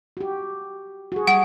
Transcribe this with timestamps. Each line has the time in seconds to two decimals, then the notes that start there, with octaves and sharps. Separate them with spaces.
0.17 F#4 G4
1.12 F#4 G#4
1.27 G3 F#5